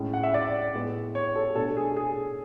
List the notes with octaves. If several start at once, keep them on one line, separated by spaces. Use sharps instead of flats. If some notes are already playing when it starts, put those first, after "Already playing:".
Already playing: A2 G#3 C#4
F#5
E5
D5
A2 G#3 B3
C#5
A4
B2 A3 D4 A4
G#4
G#4